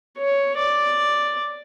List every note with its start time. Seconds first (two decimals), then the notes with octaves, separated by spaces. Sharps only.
0.18 C#5
0.56 D5